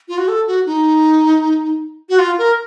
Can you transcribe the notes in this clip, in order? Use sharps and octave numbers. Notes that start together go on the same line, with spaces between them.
F4
F#4
A4
F#4
D#4
F#4
F4
A#4